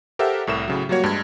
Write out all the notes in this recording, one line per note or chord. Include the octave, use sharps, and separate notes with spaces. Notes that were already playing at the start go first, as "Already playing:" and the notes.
G4 A4 A#4 C5 E5 F#5
C2 A2 A#4 E7
A2 C#3 F#3
F#3 G3 A#3 F#4 C#5
G2 G#3 G#6